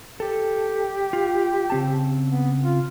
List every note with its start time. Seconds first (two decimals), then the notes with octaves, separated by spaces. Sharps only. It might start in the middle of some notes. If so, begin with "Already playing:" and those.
0.20 G4 A4
1.13 F4
1.70 C#3 C4 A5
2.27 B3
2.62 F4